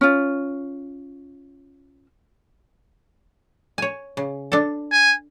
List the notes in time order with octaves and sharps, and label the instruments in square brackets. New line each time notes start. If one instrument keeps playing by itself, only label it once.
[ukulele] C#4 F4
[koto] C#5 G#5
C#3
D4 A4
[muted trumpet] G#5